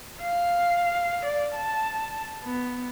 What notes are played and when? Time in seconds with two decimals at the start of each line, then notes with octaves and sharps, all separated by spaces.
0.21 F5
1.25 D5
1.54 A5
2.44 B3